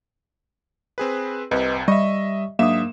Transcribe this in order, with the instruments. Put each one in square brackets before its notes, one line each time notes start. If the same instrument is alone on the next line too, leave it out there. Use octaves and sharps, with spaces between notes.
[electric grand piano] C4 G#4 B4
[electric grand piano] C2 C3 [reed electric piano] B4 D#5
[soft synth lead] G3 [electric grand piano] D#5 E5 [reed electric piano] C#6
[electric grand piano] G#2 E5 E7 [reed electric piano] F#3 D4 D#6 [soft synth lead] A#3